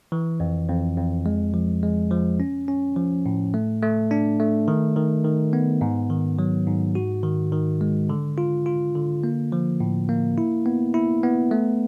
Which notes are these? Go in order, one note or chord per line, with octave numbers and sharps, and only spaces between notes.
E3
F2
F2
F2
G#3
F3
G#3
F3
C#4
C#4
F3
A2
A3
A3
D4
A3
D#3
D#3
D#3
B3
G#2
D#3
F#3
G#2
F#4
D#3
D#3
G#3
D3
F4
F4
D3
A#3
F3
A2
A#3
E4
B3
E4
B3
A3